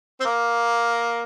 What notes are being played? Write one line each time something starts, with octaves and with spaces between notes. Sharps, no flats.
C4
A#3